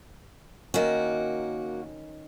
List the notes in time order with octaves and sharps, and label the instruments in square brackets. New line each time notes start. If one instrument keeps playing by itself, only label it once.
[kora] D#3 C#4 [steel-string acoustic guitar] A#3 F#4